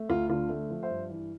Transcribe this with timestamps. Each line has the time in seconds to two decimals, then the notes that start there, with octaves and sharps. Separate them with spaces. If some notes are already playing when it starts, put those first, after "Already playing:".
Already playing: A3
0.09 D2 F4
0.29 D3 F4
0.49 A3
0.70 F3
0.83 C5 E5
0.90 G2
1.10 E3